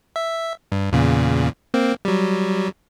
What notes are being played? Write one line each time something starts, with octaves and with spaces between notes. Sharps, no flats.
E5
G2
E2 A#2 C#3
A#3 C4
F#3 G3